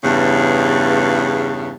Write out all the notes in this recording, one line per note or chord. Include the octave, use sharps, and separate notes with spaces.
E2 G2 C#3